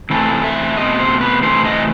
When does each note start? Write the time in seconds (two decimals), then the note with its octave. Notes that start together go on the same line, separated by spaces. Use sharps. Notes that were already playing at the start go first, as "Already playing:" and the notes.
0.10 C3 E3 A3 C4 A4
0.44 E5
0.77 B2 A3 C4 D#5
0.99 C5
1.21 B4
1.43 C3 E3 A3 C4 C5
1.65 D#5